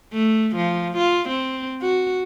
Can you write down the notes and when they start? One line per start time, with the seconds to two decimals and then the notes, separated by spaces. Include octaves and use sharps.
0.13 A3
0.56 F3
0.97 F4
1.29 C4
1.82 F#4